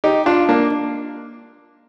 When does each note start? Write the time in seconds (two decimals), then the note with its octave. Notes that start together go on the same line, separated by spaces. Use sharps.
0.04 D#4 G4
0.26 D4 F4
0.49 A#3 D4